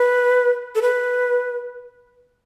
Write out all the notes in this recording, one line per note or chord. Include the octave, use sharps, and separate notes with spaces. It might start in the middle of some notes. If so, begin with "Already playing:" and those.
Already playing: B4
A4
B4